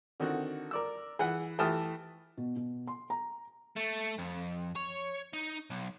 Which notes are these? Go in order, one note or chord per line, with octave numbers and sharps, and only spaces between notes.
D3 D#3 C4 F#4
A#4 D5 E6
E3 G#4 F#5
E3 A3 G4 A5 D#6 F6
B2
B2
C6
A#5
A3
F2
C#5
D#4
B1